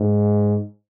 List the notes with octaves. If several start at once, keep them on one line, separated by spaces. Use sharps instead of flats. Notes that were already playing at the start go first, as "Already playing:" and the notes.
Already playing: G#2